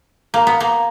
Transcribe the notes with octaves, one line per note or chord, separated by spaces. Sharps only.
A#3
B3
A#3